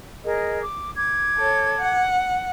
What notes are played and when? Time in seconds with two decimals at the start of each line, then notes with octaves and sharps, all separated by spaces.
0.23 G#4 A#4 D#5
0.62 D6
0.95 D6 G#6
1.38 A4 C#5
1.78 F#5